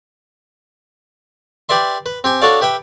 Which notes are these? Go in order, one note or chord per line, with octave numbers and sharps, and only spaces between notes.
G4 B4 D5 E5 C6
B4
C4 G4 G#5
D4 F#4 A4 C#5 D5 F5
G4 B4 E5 G5